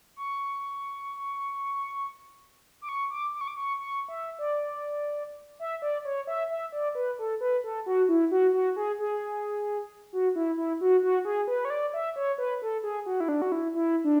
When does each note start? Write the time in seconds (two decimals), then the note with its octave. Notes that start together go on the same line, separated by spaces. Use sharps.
0.16 C#6
2.82 D6
2.89 C#6
3.11 D6
3.34 D6
3.41 C#6
3.48 D6
3.57 C#6
3.78 C#6
4.08 E5
4.39 D5
5.59 E5
5.82 D5
6.05 C#5
6.27 E5
6.50 E5
6.72 D5
6.95 B4
7.19 A4
7.41 B4
7.64 A4
7.86 F#4
8.09 E4
8.31 F#4
8.54 F#4
8.76 G#4
8.99 G#4
10.13 F#4
10.36 E4
10.57 E4
10.81 F#4
11.03 F#4
11.25 G#4
11.48 B4
11.65 C#5
11.70 D5
11.94 E5
12.16 C#5
12.38 B4
12.62 A4
12.83 G#4
13.06 F#4
13.20 E4
13.28 D4
13.42 F#4
13.52 E4
13.75 E4
14.04 D4